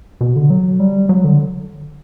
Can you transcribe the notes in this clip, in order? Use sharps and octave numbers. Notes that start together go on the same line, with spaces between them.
B2
D3
F#3
G3
F#3
D3